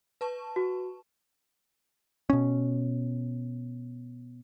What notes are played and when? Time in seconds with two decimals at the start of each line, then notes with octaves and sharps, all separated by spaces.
0.21 B4 A5 C#6
0.56 F#4
2.30 B2 C#4